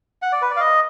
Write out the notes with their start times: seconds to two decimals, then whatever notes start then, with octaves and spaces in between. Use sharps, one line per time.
0.22 F#5
0.32 D5
0.42 B4
0.51 D5
0.56 F5
0.60 D#5